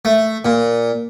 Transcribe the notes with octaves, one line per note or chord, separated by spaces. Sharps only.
A3
A#2